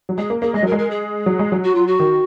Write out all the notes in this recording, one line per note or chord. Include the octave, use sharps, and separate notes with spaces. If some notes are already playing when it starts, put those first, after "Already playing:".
F#3
G#3 G#4
A#3
A#3 G#4
G#3 D#5
F#3 A#4
G#3
A#4
G#4
F#3
G#3
F#3
F#4
F4
F#4
D#3